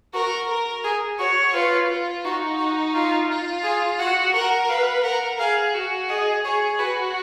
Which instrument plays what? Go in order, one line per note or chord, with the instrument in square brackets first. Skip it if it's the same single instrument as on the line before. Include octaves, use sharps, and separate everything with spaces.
[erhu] F#4 [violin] A#4
[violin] A#4
[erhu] G#4
[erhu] F#4 [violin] C#5
[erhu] F4 [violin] B4
[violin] F4
[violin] D#4 [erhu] F#4
[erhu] F#4
F4
[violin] F4
[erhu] G#4
[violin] F#4 [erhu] F#5
[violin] A#4 [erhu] F#5
[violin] B4 [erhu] F5
[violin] A#4 [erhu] F#5
[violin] G#4 [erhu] F5
[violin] F#4
[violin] G#4 [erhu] D#5
[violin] G#4 [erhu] C#5
[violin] F#4 [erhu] B4